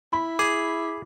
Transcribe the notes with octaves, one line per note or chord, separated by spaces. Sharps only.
E4 B5
G#4 D6